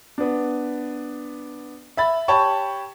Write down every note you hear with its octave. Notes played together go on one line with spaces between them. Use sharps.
B3 D4
E5 B5 A6
G4 C#5 G5 A5 B5 C#6